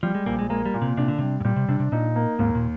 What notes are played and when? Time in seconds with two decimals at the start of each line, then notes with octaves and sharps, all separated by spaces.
0.03 F3 G3
0.15 G#3
0.26 A#1 A#3
0.39 G#3
0.50 G#3 A#3
0.66 G3
0.74 A#2
0.82 C3
0.97 C3 D4
1.08 D3
1.18 C3 G3
1.40 G#2
1.45 A#2 G3
1.56 C3
1.69 C3 D4
1.80 C3
1.92 A#2 D#4
2.16 A#3
2.39 D#2 G#2
2.55 A#2